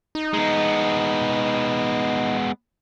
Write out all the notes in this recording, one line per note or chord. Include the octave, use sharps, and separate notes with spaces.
D#4
G#3 B3